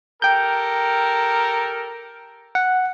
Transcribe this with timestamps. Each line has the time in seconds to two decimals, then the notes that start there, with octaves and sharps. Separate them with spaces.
0.22 G4 A4 A#4 G5 G6
2.55 F#5